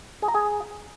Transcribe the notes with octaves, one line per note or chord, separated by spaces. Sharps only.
G#4
A#5
G#4